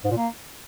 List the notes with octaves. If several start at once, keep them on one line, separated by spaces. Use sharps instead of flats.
G#2
A#2
A#3